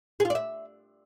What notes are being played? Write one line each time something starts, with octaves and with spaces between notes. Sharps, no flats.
G#4
F4
D5
E5